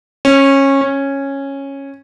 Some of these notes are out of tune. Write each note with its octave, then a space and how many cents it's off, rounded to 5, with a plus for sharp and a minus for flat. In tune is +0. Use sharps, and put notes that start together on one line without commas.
C#4 -20
C#4 -10